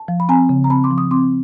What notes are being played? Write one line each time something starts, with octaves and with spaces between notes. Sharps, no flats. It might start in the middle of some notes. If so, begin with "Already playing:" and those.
Already playing: A5
F3
B5
C4 G#5 A#5
C#3
A#5
C4 A5 B5
C6 D6
F3
C#6 D#6
C4 C6 D6